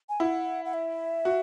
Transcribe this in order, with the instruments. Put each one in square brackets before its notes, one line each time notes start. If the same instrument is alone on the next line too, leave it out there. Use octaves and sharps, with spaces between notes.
[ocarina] G#5
[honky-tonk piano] E4 [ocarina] F#5
[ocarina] F#5
E5
[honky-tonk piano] F#4